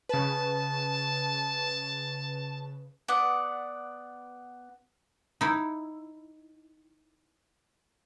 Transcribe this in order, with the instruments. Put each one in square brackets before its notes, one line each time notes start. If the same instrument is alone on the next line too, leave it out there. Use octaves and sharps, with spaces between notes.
[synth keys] C#3 B4 [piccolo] A5
[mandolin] B3 D5 F#5
[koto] D#4 E4